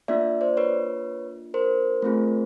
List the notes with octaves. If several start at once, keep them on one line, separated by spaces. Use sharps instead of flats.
A#3 D4 F4 D5 E5
C5 D5
B4 C#5
A#4 C5
A3 C4 F4 G#4